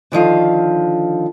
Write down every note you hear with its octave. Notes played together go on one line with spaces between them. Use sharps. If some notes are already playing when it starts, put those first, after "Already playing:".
D3 D#3 F3 F5